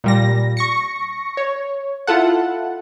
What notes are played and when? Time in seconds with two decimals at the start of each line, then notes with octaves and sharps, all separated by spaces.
0.04 A#2 G3 A#6
0.57 C#6 A#6 C#7
1.37 C#5
2.07 E4 F4 A4 F#5